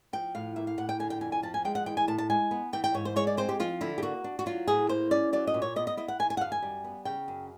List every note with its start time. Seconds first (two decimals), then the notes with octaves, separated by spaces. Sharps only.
0.13 F3 G5
0.35 A2 F5
0.56 A#3 E5
0.67 F5
0.78 A2 F#5
0.89 G5
0.99 D3 G#5
1.10 G5
1.21 F2 G#5
1.32 G#5
1.43 F3 A5
1.54 G#5
1.65 G#3 G5
1.75 F#5
1.86 E3 G5
1.97 G#5
2.08 A2 A5
2.18 A5
2.30 G#3 G#5
2.51 B3
2.73 E3 G5
2.84 G5
2.94 G#2 C#5
3.05 C5
3.16 G#3 C#5
3.27 D5
3.37 C4 C5
3.49 G4
3.60 F3 F4
3.81 D3 E4
3.98 G4
4.02 A#3 F#4
4.24 D4
4.39 F#4
4.46 F#3 F4
4.68 A2 G#4
4.89 A#3 C5
5.11 C#4 D5
5.33 F#3 D5
5.47 D#5
5.54 A#2
5.62 C#5
5.76 B3 D#5
5.87 D#5
5.97 E4 D#5
6.08 F#5
6.19 D#3 G#5
6.30 G#5
6.37 F#5
6.41 F#2 F5
6.52 G#5
6.62 G3
6.84 B3
7.05 C#3 G5
7.28 F#2